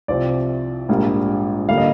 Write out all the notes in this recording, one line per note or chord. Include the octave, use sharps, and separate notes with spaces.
C2 C3 F3 C4 D5
A#1 G#2 G3 A#3
D3 G3 A#3 F5
D#5